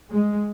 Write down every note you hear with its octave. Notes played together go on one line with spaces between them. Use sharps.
G#3